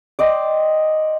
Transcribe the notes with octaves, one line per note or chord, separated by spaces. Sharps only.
D5 D#5 G5 C6